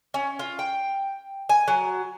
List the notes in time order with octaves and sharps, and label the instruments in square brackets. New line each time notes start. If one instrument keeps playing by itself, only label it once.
[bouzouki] C#4
F4
G5
G#5
F#3